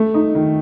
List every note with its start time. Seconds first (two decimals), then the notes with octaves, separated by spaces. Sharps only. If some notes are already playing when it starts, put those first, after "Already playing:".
Already playing: A3
0.14 D#4
0.35 D#3